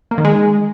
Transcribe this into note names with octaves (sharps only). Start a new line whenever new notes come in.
A#3
D#3
G#3